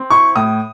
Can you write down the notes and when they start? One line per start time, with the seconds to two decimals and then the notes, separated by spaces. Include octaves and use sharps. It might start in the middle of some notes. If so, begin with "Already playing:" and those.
Already playing: C4
0.10 E4 C#6
0.36 A2 D#6